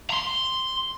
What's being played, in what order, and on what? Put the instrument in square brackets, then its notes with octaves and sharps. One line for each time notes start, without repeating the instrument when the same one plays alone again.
[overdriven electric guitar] A#5 C6